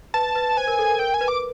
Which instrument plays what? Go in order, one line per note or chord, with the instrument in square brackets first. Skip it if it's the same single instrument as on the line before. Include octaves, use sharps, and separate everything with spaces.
[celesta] B4 [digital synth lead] A5
[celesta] B4
[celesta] C5 [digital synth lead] G#5
[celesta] A#4
A4
A#4
[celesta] A#4 [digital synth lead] G5
[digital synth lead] G#5
[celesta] B4
[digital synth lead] D6